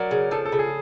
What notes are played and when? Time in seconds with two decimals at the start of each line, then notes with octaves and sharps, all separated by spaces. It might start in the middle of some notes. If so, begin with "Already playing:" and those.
Already playing: F#3 A#4 D5
0.11 C#3
0.31 F3 A4
0.45 A4
0.52 C#3
0.59 G#4